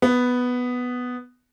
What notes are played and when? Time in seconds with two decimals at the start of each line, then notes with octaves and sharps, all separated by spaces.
0.02 B3